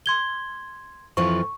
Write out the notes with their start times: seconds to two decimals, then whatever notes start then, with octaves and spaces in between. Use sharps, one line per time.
0.06 C6 G#6 G7
1.17 F2 E3 F3 C#6